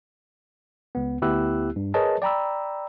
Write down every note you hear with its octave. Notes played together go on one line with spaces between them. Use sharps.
C#2 B3
D2 B3 E4 G4 E6 F#6
G2
G#4 A#4 B4 C#5 D#5 A5
D5 G5 A#5 B5 E6